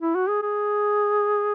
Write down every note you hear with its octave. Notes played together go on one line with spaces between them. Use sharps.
E4
F#4
G#4
G#4